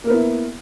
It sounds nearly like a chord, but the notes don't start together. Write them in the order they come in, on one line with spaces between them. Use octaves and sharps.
A#3 A#4 B3 E4